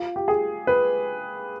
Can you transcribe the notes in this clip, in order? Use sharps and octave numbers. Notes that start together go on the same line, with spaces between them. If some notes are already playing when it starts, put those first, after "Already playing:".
Already playing: F4
G4
G#4
B4